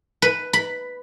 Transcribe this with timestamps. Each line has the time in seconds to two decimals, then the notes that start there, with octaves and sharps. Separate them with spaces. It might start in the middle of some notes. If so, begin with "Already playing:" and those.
0.22 B4
0.53 B5